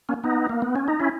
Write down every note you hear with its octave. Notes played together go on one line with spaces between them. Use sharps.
A#3 C#4
B3 D#4
A#3
B3
C#4
D#4
C#4 E4